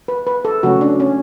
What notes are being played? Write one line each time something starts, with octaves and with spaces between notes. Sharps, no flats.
B4
B4
A4
C#3 F#3 A3 C#4 F#4
D4
C#4